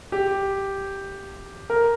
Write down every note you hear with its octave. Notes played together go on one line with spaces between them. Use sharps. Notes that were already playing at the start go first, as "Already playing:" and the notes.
G4
A#4